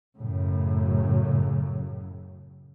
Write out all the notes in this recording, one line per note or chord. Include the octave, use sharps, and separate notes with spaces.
F#2 A2 C#3